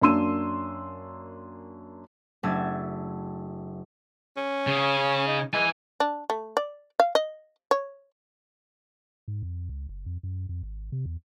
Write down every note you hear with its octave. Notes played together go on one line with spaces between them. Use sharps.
F#2 A#3 D4 C6 E6 D#7
F#1 A3 D4 G#6 A6 E7
C#4
C#3
D#4
G#3 E4 G#5
D4
A3
D5
F5
D#5
C#5
G#2
F2
C#2
F#1
F2
F#2
F2
G#1
C3
E2